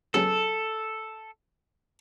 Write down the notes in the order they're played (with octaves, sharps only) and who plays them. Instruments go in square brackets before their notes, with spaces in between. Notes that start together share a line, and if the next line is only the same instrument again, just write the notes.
[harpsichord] C#3 F#3 B3 [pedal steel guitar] A4